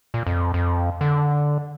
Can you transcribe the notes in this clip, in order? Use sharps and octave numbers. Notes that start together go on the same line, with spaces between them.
A#2
F2
F2
D3